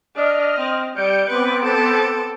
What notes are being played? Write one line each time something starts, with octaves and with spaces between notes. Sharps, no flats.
D4 D#5 F6
C4
G3 G6 C#7 D7
B3 C4 B4 D6
A4